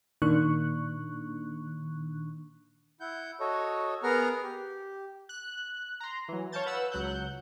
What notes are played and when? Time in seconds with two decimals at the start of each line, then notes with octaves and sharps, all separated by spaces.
0.22 A#2 D#3 A#3 D4 C#6 F#6
3.00 E4 F#5 G6
3.40 F#4 A4 C#5 D#5
4.03 B3 G#4 A#4 F#5 A#5 F6
4.43 G4
5.29 F#6
6.00 A#5 C6
6.28 E3 F#3
6.52 C#5 F5 A5 G6 A6
6.66 B4 F#5 E6
6.91 C#2 F#3 F#5 F#6 G6